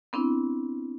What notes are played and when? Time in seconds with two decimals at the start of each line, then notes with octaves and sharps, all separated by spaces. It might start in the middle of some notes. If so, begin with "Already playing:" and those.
0.13 B3 C4 D4 E4